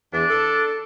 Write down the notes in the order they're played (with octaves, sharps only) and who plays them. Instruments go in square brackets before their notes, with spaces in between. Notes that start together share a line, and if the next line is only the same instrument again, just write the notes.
[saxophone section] E2 [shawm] D4
[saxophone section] A4